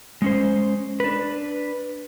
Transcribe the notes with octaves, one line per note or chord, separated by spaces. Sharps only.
G#3 C#4 C5
D4 B4